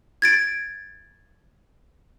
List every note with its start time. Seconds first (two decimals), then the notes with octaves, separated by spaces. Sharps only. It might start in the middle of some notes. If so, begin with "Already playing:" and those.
0.22 G#6 A6 D7